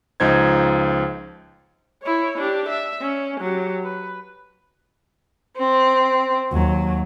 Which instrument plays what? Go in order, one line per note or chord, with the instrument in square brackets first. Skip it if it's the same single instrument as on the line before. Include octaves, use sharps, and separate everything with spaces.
[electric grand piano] C#2 F3 D#4 C5 G#6
[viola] E4 C#5
D4 G4
E5
C#4
F#3 G4
B4
[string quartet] C4
[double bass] D#2 [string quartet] F#3